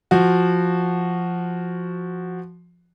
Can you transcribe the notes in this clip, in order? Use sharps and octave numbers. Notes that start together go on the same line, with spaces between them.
F3 F#4